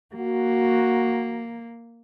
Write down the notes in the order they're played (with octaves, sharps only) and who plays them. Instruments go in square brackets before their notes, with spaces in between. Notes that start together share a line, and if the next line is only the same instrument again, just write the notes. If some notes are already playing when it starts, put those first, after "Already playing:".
[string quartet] A#3 [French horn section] F#4